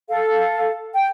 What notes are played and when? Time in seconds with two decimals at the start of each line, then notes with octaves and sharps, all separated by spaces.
0.09 A4 F5
0.94 G5